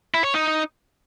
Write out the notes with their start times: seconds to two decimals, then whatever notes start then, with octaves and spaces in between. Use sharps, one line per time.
0.14 E4
0.24 C#5
0.34 D#4